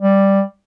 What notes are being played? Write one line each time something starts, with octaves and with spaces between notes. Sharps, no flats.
G3